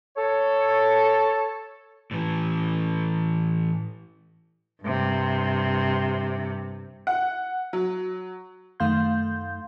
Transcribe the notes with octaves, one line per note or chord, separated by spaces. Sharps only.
A4 C#5
A2 E3
G2 C3
F#5
F#3
F#2 D#3 A3 F5 C6 G6